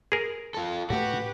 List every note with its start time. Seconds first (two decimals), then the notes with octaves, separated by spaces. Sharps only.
0.12 G#4 A#4
0.54 F4 A4
0.90 A2 A3 F#4 G4 B4